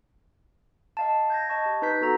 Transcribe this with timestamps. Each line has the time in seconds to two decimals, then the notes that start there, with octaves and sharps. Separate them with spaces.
0.97 D#5 F5 A5
1.30 G6 G#6 A#6
1.50 D#5 A5 C#6
1.66 G4
1.82 D#4 B4 G6 B6
2.01 B3 F#4 A4 A#5